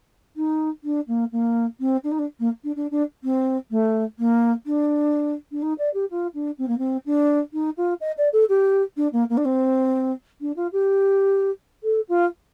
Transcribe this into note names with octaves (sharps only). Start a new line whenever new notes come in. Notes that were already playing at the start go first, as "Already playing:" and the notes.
D#4
D4
A#3
A#3
C4
D4
D#4
D4
A#3
D4
D4
D4
C4
A3
A#3
D4
D4
D#4
D5
G4
F4
D4
C4
A#3
C4
D4
D#4
F4
D#5
D5
A4
G4
D4
A#3
A#3
D4
C4
D4
F4
G4
A4
F4